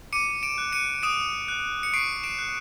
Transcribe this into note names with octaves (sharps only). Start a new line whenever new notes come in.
D6 C#7 D#7
D7 E7
F#6
C#7 D#7
D#6 D7 E7
F#6
C#7
C#6 C7 D7
D7 E7
F#6